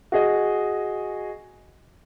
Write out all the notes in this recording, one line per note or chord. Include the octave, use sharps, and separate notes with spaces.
F#4 G#4 D#5